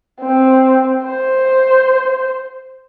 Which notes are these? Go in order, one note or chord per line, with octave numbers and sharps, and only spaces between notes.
C4
C5